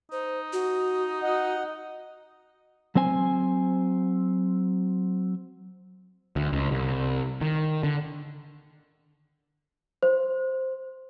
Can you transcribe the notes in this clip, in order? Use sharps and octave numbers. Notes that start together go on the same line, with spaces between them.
D#4 C5
F#4
D#5 F#5
F#3 C4 C5 G#5
D2
C#2
C2
D#3
D3
C5